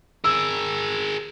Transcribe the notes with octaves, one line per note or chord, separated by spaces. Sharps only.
G#4 A#4 E6